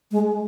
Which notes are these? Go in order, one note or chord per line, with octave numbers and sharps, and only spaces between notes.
G#3